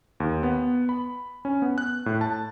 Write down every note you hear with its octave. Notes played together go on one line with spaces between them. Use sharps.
D#2
B3
B5
C#4
B3
F#6
A2
A5